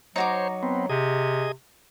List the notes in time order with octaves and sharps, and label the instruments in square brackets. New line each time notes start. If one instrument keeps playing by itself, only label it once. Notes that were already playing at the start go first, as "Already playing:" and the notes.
[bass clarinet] F#3 [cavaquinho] D#4 F#4 D6 [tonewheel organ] C5 C#5
[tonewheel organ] B3 C4
[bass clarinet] C3 [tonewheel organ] G#4 D#5